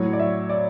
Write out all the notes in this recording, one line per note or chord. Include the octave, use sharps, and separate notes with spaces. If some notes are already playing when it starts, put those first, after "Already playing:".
Already playing: A2 F#3 C#5
D5
E5
D5